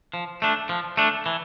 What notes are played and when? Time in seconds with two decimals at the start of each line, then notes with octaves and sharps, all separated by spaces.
0.14 F3
0.42 A3 D4
0.69 F3
0.97 A3 D4
1.26 E3